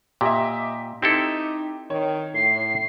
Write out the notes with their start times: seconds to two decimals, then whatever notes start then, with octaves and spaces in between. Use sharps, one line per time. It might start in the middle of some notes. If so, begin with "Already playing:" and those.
0.21 A#2 G4 D#5 E5
1.02 C4 D#4 E4 G4 A4
1.90 D#3 C#5
2.35 A2 C7